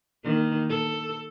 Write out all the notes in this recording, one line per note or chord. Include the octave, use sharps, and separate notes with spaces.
D#3 A#3
A4